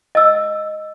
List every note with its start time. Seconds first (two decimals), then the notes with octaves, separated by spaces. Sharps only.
0.15 D#5 E6